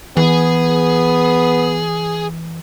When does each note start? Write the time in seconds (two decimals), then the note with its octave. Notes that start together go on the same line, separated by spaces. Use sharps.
0.17 E3 B3 G#4